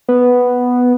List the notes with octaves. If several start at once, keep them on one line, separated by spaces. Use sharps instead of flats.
B3